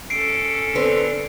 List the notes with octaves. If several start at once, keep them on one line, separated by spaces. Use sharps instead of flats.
C#4 A4 C7 D7
D3 B3 C4 B4